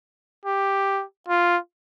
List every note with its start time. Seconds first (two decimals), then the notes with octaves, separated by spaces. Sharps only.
0.45 G4
1.28 F4